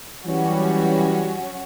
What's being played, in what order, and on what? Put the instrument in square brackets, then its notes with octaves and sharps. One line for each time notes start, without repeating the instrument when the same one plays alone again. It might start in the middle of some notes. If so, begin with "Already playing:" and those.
[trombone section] E3 G3 [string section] F#3 C#4 F#4